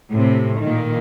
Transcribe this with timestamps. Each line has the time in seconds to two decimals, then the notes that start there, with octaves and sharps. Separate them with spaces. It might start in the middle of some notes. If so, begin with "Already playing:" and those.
0.11 A2 C3
0.59 A#2 D#3